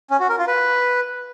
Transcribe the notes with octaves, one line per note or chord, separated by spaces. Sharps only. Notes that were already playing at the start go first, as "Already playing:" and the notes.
C#4
F#4
A#4
F4
B4